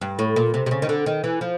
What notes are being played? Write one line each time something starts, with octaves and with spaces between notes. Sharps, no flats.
G2
A2
A#2
C3
C3
C#3
D#3
D3
D#3
E3
F3